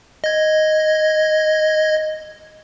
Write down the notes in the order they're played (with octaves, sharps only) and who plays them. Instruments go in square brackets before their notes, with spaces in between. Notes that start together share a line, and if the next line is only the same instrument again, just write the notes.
[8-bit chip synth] D#5 G#6